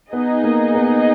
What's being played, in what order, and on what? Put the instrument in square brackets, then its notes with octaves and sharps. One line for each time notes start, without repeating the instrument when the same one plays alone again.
[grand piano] B3 [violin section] D#4 G#4 D#5
[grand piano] A#3
B3